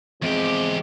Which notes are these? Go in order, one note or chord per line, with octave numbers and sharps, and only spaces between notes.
E2 F3 G#3 C4 G4